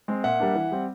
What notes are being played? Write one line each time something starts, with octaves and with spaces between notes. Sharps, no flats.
G#3 C4
A#2 E5 F#5
G3 A#3 D4
E3
G3 C4